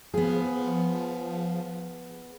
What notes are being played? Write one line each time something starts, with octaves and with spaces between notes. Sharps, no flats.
F3 B3 G#4